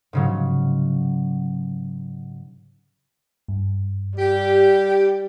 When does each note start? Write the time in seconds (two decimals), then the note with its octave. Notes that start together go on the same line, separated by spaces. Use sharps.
0.13 G#2 C#3 F#3
3.48 G2
4.19 G3 G4